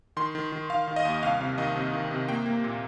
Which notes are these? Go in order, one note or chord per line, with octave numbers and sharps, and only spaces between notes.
D#3 C6
D#3
D#3
D#3 F5
D#3
D#5
D#2
C2 F5
C3 F5
D#3 D#5
C3
D#3
C3
A#3 G5
A#3
A#2